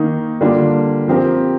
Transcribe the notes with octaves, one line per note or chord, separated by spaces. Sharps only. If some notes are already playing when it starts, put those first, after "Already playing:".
Already playing: D#3 A#3 D#4
D3 G3 A#3 D4 F4
F3 C4 G4 A#4